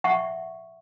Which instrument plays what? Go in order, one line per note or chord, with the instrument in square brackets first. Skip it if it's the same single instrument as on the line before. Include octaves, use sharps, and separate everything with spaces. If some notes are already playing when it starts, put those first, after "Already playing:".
[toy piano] E5 F#5 C#6